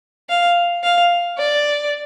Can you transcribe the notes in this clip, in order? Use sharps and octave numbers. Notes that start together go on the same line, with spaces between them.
F5
F5
D5